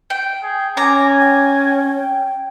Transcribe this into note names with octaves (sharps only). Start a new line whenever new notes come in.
G5
G#4
C#4 G#5 A#5 D6
G5